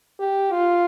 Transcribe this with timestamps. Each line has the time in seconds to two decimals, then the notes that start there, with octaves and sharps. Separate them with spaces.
0.19 G4
0.51 F4